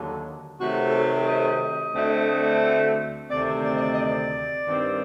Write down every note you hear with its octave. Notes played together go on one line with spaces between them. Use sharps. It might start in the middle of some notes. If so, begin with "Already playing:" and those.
Already playing: D#2 D3 F#3
C3 D#3 F#3 A3 C4 F#4
A4
G4
D#5
D2 D3 A3 C4
D2 C3 D#3 A3 C4 D5
D5
D#5
D5
D#5
D5
G2 D#3 G3 C4